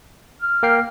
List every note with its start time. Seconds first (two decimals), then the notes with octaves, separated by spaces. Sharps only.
0.40 F6
0.63 A#3 G5 C7